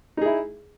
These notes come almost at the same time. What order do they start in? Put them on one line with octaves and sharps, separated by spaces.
D#4 G#4 E4